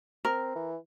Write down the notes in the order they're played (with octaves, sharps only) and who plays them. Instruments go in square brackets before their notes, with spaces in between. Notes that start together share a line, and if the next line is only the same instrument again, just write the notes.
[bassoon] C4 [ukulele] A#4
[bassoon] E3